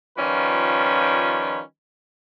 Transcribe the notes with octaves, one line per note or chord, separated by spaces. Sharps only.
D#3 F3 G3 C#4 F4 B4